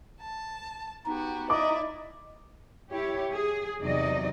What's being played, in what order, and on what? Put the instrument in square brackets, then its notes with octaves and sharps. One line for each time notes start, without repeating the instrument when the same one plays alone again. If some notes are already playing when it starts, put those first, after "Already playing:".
[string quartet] A5
[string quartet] B3 F#4 G4 [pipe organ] D#4
[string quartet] E4 D5 [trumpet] D#5 [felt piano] D6
[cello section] E4 G4 C#5
G#4
E2 C3 F#3 D#4 D5 D#5